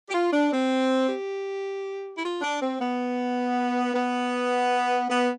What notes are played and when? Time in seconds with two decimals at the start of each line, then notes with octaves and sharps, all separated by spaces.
0.09 G4
0.13 F4
0.33 D4
0.52 C4
1.09 G4
2.17 E4
2.23 F4
2.42 D4
2.61 C4
2.80 B3
3.94 B3
5.09 B3